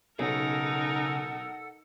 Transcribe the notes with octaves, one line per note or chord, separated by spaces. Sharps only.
B1 C#3 D#4 A4 A#4 F#5 E6